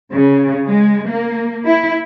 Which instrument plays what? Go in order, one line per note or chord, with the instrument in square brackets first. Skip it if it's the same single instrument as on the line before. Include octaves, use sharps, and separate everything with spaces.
[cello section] C#3
G#3
A#3
E4